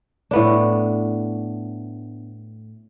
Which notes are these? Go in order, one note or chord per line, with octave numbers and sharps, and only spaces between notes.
A2 B3 D4